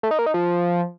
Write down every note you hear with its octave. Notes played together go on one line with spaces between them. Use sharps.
A3
D#4
A#3
D#4
F3